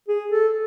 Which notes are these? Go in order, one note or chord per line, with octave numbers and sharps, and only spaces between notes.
G#4
A4